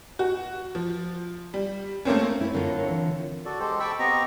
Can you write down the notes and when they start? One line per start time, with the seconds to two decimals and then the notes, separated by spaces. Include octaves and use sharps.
0.19 F#4
0.75 F3
1.54 G3
2.05 A3 A#3 C4 C#4
2.41 E4
2.54 D3 C4 F4 A#4 C#5
2.90 E3
3.45 F#4 A4 D5
3.60 G#3 G4 A4 C5
3.80 G5 A5 B5 C#6 D6 E6
3.99 B3 C4 G4 D#5 A#5 C#6